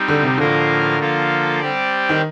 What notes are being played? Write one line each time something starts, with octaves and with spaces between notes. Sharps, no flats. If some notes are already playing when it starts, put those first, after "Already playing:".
Already playing: G3 C4 D#4
D3
C3
A2 D3 F3 A#3 F4 A#4
F3 A#3 F4 A4
G3 C4 G4 D5
D#3